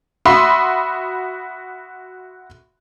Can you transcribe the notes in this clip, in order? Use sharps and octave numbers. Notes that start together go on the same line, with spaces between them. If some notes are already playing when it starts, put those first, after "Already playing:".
F#4 E5 B5 C6 D#6